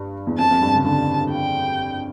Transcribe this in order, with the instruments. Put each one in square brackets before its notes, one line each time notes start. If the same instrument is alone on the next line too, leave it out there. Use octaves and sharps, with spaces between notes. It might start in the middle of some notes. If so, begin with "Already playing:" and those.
Already playing: [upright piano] G2
E2
[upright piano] F2 [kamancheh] A5
[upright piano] F2
G2
C#3
[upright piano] D3 [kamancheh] A5
[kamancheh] G5